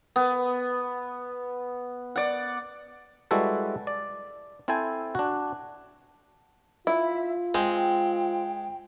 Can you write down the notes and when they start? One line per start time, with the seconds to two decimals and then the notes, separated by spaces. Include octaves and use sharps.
0.16 B3
2.16 D5 F#5
3.31 G3 G#3 E4 F#4 A4 B4
3.87 D5
4.68 C4 E4 A4 C5 G#5
5.15 D4 F#4
6.87 E4 F4 E5
7.54 G#3 C4 G5